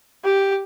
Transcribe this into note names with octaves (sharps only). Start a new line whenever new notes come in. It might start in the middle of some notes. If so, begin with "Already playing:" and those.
G4